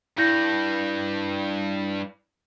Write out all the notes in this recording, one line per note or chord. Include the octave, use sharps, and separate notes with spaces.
G2 E4 G6 A#6